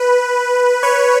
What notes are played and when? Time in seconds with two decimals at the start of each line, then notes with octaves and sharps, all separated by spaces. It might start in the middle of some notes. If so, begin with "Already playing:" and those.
Already playing: B4
0.83 B4 C#5